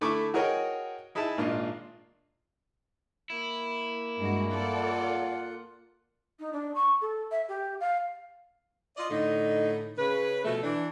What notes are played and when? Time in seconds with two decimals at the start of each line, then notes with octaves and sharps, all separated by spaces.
0.01 D3 A3 E4 E5 C#6 D6
0.34 F#4 G#4 A#4 C#5 D#5 G5
1.15 D#4 E4 G#4 E5 A5
1.38 G#1 A#2 D4 F4 D#5
3.30 A#3 E4
4.18 G2 G#3 F#4
4.50 F4 A4 D5 F#5
6.39 D#4
6.52 D4
6.74 C#6
7.01 A4
7.31 E5
7.48 G4
7.80 F5
8.97 F4 D5 D#5
9.10 A2 D3 D#4
9.98 C#3 B4
10.44 B2 F3 A3
10.63 E3 D4